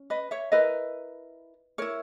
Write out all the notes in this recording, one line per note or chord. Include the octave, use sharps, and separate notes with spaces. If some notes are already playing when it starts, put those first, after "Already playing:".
Already playing: C#4
B4 D#5
C#5 E5
E4 A#4 B4 D#5
E4 A#4 C#5